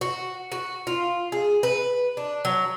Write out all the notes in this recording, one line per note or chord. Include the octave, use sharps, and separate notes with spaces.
F#4
F#4
F4
G#4
B4
D4
F#3